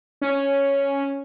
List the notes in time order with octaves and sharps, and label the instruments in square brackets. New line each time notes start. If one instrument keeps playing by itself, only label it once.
[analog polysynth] C#4